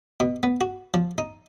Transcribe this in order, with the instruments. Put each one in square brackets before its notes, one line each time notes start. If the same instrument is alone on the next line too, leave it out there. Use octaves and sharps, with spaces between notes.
[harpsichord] B2
B3
F#4
F3
D#4